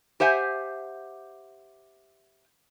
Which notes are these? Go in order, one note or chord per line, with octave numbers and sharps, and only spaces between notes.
G4 C5 E5 F#5 G#5